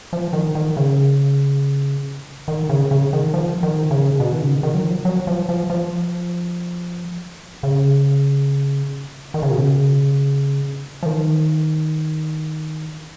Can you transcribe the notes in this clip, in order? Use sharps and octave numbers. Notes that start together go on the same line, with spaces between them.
F3
D#3
D#3
C#3
D#3
C#3
C#3
D#3
F3
D#3
C#3
B2
D#3
C#3
D#3
F#3
F3
F#3
F3
F3
F3
C#3
D#3
C#3
B2
C#3
F3
D#3